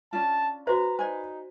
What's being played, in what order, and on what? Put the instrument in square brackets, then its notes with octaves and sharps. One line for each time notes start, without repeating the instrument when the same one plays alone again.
[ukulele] C#4 D4 F4 [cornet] A5
[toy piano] F#4 C5 [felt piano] B4 [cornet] A#5
[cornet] D#4 [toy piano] C5 D5 [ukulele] G#5